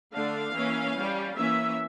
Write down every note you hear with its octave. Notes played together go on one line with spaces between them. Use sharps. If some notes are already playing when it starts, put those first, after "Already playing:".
D3 A3 D4 F5
E3 A#3 C#4
G3 C#4
E3 A#3 C#4 E5